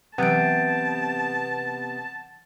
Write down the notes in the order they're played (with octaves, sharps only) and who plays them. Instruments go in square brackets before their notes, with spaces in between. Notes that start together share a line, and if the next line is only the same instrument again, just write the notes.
[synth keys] C3 B3 [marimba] E3 F#3 [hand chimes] F#5 G6 D7 [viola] A5